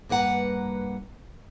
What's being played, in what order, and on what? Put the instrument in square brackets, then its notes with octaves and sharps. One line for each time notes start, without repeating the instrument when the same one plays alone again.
[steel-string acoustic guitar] G2 A#3 B4 F#5 A#5